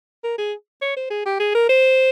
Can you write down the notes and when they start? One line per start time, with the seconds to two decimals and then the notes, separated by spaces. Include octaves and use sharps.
0.24 A#4
0.38 G#4
0.82 C#5
0.97 C5
1.11 G#4
1.26 G4
1.40 G#4
1.55 A#4
1.69 C5